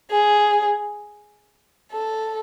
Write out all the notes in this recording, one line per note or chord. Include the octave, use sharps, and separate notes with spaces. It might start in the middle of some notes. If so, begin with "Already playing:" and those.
G#4
A4